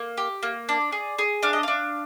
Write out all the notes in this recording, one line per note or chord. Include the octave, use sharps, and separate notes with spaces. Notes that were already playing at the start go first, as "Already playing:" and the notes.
Already playing: A#3
G4
A#3
D4 D5
G#4
G#4
D4 F5
D#5
D4 F5